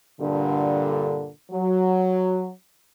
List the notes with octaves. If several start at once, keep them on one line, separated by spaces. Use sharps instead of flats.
G2 A#2 D3
F#3